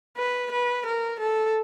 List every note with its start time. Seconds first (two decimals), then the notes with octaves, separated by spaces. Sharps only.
0.18 B4
0.51 B4
0.86 A#4
1.19 A4